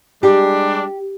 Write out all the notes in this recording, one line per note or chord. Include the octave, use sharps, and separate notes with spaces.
G3 G#3 D4 G4